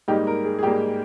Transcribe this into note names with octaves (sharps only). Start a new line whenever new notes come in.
G#2 G3 A#3 D#4 G4
A#4
G#4
G#4
G#2 G3 A#3 D#4 G4